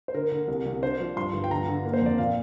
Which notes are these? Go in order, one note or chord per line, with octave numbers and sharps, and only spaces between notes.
C5
D3 A#4
D3
C2
C2
D4 C5
F3
G2 C6
G1
G5
D3 A#5
D3
A#3
C5
F2 D5
A#2 F5